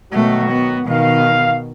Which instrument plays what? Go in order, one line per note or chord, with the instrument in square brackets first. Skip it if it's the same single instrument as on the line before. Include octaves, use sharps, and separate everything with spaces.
[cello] B2 A3 [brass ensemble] D#3 F#3 F#4
[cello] B3
[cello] B2 D#3 [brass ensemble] F5